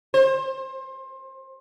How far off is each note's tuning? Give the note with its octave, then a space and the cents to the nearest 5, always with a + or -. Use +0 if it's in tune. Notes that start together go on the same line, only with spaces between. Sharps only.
C5 +25